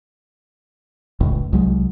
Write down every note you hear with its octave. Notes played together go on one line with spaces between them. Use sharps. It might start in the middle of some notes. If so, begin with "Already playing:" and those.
F1 C#2 A2
C2 F#3 G#3